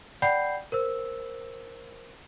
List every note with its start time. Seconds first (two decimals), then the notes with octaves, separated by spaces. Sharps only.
0.22 D5 F#5 G5 B5 G6 C7
0.72 A#4 C5 E6